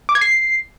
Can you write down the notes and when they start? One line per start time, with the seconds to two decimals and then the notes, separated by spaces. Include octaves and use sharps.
0.09 D6
0.15 G#6
0.21 C7